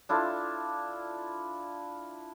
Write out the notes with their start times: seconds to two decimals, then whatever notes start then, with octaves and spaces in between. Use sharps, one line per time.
0.09 D4 E4 F4 A4